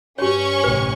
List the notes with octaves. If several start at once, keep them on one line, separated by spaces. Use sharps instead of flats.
G2 C#4 G4 C#5 C#6
A1 C3 B4